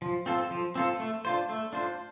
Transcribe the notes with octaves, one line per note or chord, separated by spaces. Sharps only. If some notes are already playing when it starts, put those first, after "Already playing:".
F3
C4 F4 A4
F3
C4 F4 A4
A3
D4 F4 C5
A3
D4 F4 C5